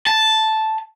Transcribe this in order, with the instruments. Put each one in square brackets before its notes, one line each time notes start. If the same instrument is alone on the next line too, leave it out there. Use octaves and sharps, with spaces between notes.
[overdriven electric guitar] A5